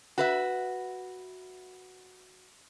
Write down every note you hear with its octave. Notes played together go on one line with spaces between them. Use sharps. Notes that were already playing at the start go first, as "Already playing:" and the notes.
F#4 B4 E5